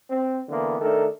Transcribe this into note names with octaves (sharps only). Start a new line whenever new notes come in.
C4
D3 E3 A#3 B3
D#3 A3 D4 A4 A#4